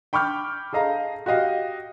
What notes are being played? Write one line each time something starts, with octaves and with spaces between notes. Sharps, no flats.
G5 B5 C#6 D6 F6 G6
G#4 A4 D#5 F5 A#5
F#4 G4 D#5 F5